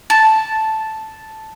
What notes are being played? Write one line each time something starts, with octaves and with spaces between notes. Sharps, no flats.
A5